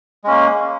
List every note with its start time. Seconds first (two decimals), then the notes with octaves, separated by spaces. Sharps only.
0.24 G#3
0.27 C#4
0.30 A#3